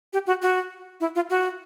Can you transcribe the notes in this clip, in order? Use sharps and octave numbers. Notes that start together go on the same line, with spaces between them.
G4
F#4
F#4
E4
F4
F#4